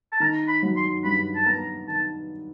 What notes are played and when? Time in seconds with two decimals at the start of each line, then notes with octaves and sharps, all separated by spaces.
0.12 A5
0.20 D#3 A#5
0.48 B5
0.63 F#3
0.76 C6
1.04 G2 B5
1.35 A5
1.46 B3 A#5
1.88 D#3 A5